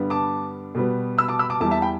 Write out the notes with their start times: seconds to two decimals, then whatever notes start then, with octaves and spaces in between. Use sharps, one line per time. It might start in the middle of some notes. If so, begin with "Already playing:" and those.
Already playing: G2 D3 G3 B3
0.10 A5 D6
0.75 B2 G3 B3
1.18 B5 E6
1.28 A5 D6
1.39 B5 E6
1.50 A5 D6
1.61 E2 E3 G3 A5 D6
1.71 E5 A5
1.82 G5 B5